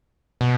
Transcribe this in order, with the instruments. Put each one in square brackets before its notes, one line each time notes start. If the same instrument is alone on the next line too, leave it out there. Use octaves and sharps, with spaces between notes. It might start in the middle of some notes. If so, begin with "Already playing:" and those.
[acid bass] B2